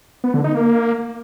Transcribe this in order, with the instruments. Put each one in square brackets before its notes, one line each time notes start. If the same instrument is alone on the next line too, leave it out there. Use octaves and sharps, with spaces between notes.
[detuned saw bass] B3
D3
D#4
A#3